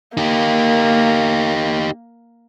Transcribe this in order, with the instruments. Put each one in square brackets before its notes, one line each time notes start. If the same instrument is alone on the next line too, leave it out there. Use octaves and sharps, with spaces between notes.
[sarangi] A#3 [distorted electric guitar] D#4 G4